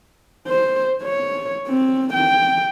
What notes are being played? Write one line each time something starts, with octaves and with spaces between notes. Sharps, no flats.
C5
C#5
C4
G5